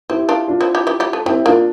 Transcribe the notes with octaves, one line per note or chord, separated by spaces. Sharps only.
C4 E4 G4
D4 F4
D4 F4
C4 E4
E4 G4
E4 G4
E4 G4
A3
G3 C4 E4
A#3 D4 F4